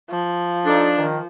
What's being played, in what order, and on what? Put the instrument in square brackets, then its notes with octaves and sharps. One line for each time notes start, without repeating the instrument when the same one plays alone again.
[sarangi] F3
[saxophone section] D4 [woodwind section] D#4 A4
[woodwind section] D#3